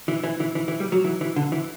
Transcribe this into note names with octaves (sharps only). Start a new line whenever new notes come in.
E3
E3
E3
E3
E3
G3
F#3
E3
E3
D3
E3